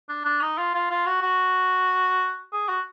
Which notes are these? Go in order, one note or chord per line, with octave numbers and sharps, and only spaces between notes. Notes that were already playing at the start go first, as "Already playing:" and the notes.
D4
D4
D#4
F4
F4
F4
F#4
F#4
G#4
F#4